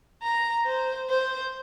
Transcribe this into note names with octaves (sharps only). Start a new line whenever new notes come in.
A#5
C5
C5